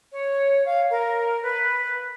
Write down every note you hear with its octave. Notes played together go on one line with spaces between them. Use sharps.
C#5
F5
A#4
B4